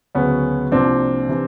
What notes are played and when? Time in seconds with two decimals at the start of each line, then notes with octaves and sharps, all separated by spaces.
0.15 D2 C#3 F#3 B3 C#4
0.72 C2 A#2 F3 C4 D4
1.29 C3 E3